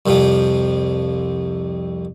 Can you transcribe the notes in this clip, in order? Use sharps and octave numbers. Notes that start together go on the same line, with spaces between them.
C2 F2 C3 F3